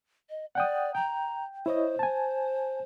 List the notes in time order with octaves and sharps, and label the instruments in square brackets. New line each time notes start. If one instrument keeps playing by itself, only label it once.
[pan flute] D#5
[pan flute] D5 [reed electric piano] F#5 G5 D#6
[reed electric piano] G5 [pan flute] A#5
[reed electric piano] E4 C#5 D#5 [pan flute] C5
[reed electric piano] G#5 A5